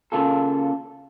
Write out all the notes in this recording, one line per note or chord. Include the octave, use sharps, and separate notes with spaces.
C#3 A#3 F4 A4